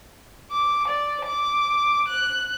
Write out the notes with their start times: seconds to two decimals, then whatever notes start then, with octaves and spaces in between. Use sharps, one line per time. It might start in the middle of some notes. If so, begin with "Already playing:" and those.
0.51 D6
0.88 D5
1.25 D6
2.08 F#6